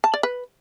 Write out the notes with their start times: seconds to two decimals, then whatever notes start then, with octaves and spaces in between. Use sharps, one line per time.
0.04 A5
0.14 D5
0.23 B4